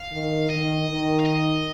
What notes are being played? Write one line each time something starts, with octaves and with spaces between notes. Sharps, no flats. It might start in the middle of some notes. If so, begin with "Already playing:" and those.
Already playing: F5
D#3
D#3 D#5
D#3
F5
D#5